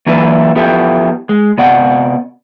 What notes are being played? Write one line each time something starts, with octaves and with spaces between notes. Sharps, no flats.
E3 F#3 A#3 D4 E4 B4
F3 B3 E4 G4 A4
G#3
C3 B3 D5 F#5